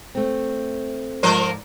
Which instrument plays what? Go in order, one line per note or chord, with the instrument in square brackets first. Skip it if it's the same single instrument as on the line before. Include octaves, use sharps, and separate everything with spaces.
[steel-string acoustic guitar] A3 C4
[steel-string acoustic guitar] G#2 D5 A#5 [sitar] F3 A#4 C5